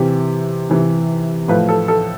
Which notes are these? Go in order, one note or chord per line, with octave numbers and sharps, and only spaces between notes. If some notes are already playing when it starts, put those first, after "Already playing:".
Already playing: C3 E3 G4
C3 E3
A2 F3 B4
A4
A4